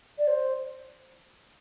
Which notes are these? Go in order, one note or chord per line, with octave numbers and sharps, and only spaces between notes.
D5
C5